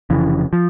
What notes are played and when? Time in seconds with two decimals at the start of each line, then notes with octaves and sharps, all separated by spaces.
0.10 F1 F2 C#3 E3
0.53 F3